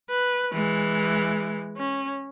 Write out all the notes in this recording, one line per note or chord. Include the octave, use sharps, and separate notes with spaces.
B4
E3 G#3
C#4